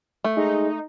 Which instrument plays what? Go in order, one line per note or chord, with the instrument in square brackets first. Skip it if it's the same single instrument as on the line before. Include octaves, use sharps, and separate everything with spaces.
[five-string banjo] A3
[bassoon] G#3 [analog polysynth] D#4